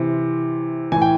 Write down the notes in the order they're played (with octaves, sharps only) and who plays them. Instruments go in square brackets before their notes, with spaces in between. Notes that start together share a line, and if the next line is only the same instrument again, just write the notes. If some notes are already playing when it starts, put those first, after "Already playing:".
Already playing: [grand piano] C3 E3
A2 E3 G#5
G5